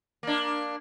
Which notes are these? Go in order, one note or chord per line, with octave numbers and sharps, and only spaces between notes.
A#3 D4